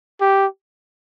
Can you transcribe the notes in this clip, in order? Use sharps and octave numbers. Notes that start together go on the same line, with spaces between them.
G4